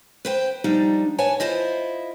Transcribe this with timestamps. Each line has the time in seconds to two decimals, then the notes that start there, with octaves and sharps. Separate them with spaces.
0.25 B4 C5 G5
0.64 F3 G3 D4 D#4
1.18 B4 C#5 G#5 A5
1.40 E4 F4 C5 D#5